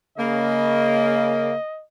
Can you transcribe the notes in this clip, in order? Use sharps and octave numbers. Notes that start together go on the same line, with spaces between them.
C#3 A#3 D#5